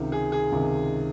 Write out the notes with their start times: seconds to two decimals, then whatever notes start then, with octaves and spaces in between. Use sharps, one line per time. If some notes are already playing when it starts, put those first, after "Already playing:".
Already playing: C#2 C3 D#3
0.12 G#4
0.32 G#4
0.52 C#2 C3 D#3